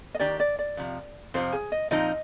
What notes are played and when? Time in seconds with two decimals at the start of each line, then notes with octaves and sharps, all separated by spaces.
0.15 D#5
0.19 D#3 A#3 D4 G4 D5
0.40 D5
0.59 D5
0.77 F2 C3 F3
1.34 F2 C3 F3 C5
1.53 G#4
1.72 D#5
1.91 A#2 F3 C4 D#4 D#5